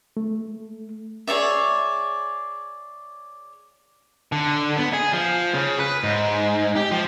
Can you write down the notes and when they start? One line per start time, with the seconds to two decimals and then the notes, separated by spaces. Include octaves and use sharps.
0.17 A3
1.27 G#4 C#5 D5 E5
4.32 D3
4.77 B3
4.93 G#4
5.13 F3
5.54 C#3
5.79 B4
6.04 G#2
6.76 G4
6.91 F3